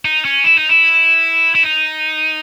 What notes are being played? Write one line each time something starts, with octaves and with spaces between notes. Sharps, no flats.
D#4
C#4
E4
D#4
E4
E4
D#4